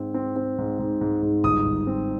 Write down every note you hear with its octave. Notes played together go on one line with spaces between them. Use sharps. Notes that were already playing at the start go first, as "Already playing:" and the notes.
Already playing: G#2 C4
C4
C4
G#2
G#2
G#2
G#2
G1 D#6
G1
C4